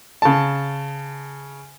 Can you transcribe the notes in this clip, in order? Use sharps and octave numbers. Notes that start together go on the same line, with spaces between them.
C#3 A5